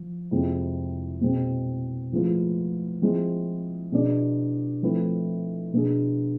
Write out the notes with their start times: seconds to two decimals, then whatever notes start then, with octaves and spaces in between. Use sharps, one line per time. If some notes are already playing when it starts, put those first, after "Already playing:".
Already playing: F3
0.31 F2 C3 G#3 C4 E4
1.21 B2 G#3 C4
2.12 A2 F3 G#3 B3 F4
3.02 F3 G#3 C4 E4
3.92 B2 B3 D4 G#4 D5
4.83 F3 A3 C4 E4 B4
5.73 B2 B3 D4 G#4